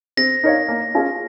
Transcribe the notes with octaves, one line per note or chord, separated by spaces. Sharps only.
C4 A#6
D#4 A#4 C#5 F5
A#3
C#4 F4 G#4